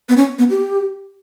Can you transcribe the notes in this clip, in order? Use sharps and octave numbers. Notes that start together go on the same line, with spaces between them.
B3
C#4
B3
G4